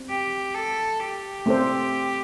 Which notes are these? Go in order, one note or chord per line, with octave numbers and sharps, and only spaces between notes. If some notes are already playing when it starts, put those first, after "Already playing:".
Already playing: C4
G4
A4
G4
A3 C4 A4 C5